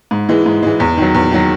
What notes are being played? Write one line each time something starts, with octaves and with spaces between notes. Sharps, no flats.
G#2
E3 G#3
G#2
E3 G#3
E2
D#3 F#3
E2
D#3 F#3